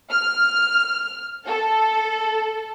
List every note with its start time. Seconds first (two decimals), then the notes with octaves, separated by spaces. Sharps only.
0.11 F6
1.48 A4